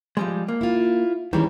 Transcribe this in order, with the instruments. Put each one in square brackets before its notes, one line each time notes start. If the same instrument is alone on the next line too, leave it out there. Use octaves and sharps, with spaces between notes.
[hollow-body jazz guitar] F3 G3 G#3
A#3
[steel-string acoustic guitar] E4 F4
[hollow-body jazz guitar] D#3 G3 [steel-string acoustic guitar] E3 G#3 C#4